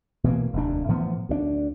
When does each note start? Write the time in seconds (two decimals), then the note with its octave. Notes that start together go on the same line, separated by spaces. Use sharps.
0.24 B2 E3 G#3 A#3
0.53 F1 D#2 D4
0.88 A2 E3 F3 B3
1.29 D2 B3 D4